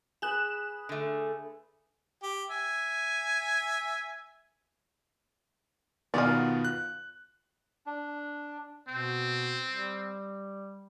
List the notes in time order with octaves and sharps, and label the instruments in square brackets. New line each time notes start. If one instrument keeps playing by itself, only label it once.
[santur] G#4 B4 B5 [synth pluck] F#6 E7
[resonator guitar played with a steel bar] D3 A3
[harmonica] G4
E5 G#5
[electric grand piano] B2 D#3 B3 [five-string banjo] F4 D5
[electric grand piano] F#6
[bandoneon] D4
[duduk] B2 [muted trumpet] C4
[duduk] G3